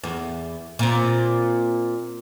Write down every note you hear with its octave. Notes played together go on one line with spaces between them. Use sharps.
E2
A#2 C4